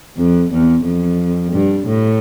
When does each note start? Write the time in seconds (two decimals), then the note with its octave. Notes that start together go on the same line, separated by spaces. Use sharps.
0.17 F2
0.52 E2
0.85 F2
1.53 G2
1.87 A2